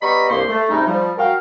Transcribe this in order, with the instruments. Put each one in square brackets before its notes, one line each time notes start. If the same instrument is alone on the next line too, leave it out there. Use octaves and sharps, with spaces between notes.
[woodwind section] G3 B3 D#5 A#5 B5 C#6
C2 G2 A#3 G4 C5 C6
A3
G#2 C3 G3 C#4 D#4
F3 G3
F#2 F#4 A#4 F5 G5 F6